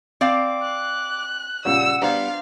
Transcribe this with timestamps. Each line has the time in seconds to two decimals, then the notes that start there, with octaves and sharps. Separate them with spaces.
0.21 C4 D5 F5 D6
0.62 F#6
1.65 A#1 C#3 G3 F#5 E6
2.02 G3 B3 D4 C5 F5 A#5